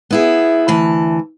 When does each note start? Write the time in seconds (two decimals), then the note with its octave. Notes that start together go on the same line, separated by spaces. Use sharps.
0.11 B3 E4 G#4
0.68 D2 E3 A5